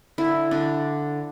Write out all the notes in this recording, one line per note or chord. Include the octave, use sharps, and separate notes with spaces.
D3 E4
D3 D4